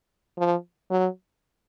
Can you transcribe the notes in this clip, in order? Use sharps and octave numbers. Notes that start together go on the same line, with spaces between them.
F3
F#3